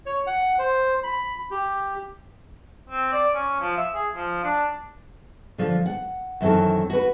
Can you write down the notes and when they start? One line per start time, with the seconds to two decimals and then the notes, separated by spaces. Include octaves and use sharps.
0.06 C#5
0.27 F#5
0.59 C5
1.03 B5
1.51 G4
2.90 C4
3.12 D5
3.34 C#4
3.60 F3
3.77 E5
3.94 G#4
4.15 F3
4.43 D4
5.58 D3 F3
5.86 F#5
6.41 F#2 D#3 E3 C4 A4
6.90 F#4 B4